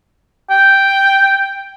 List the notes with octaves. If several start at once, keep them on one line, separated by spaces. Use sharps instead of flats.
G5